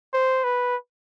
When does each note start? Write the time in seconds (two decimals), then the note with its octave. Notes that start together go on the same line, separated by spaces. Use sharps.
0.14 C5
0.44 B4